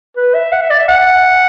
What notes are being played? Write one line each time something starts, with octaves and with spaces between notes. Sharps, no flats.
B4
E5
F#5
E5
D5
E5
F#5